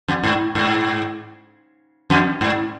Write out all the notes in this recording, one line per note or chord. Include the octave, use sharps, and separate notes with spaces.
F2
G#2
G#2
F2
G#2